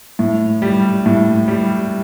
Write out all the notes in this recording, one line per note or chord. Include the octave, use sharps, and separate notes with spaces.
A2
G3
A2
G3